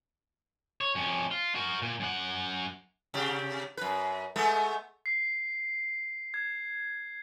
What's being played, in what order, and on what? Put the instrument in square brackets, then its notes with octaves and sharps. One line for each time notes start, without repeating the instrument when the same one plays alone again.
[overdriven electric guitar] C#5
F2 C#4
F4
F#4 A#4
A#2
F#2 F#5
[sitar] C3 G4
F#2 B4
G#3 A3 B3
[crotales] C7
G#6